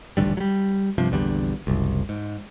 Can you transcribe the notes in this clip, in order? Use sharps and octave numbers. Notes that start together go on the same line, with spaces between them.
D#1 A1 D3 G3
F#3 G3
G2 C3 F3
A#1 E2 D3 G3
F#1 C2
G#2